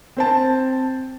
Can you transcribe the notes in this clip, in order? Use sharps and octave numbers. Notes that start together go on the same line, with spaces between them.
C4 C5 A5